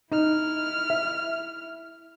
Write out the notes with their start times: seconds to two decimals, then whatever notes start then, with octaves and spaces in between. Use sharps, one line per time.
0.12 D#4 E4 F6
0.90 E5